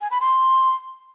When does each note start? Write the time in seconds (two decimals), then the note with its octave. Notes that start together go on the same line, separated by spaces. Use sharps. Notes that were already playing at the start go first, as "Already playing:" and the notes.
0.01 G#5
0.11 B5
0.21 C6